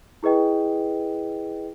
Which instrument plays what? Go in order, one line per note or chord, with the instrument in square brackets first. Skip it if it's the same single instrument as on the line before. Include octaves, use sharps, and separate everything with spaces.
[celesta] E4 G#4 B4 D#5 G5